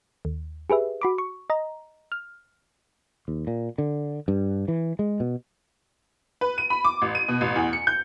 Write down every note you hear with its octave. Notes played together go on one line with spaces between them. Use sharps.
D#2
G4 G#4 B4 E5
F#4 B5 D6
C#6
D#5 A#5
F6
D#2
A#2
D3
G2
E3
G#3
B2
B4
D#7
B5
D6
A1
D#7
B2
A1
E2
C#7
G6